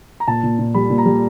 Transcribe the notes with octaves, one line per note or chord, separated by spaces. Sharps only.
A#5
A#2 A5
A#2
A#2
G3 B5
A#2
A#5
G3